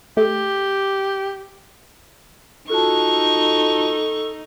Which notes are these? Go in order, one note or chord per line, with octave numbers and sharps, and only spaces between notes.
A3 G4
D#4 F4 F#4 A4 A5 C#6